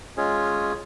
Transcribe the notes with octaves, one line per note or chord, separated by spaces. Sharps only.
G#3 C#4 F4 G#4 C#5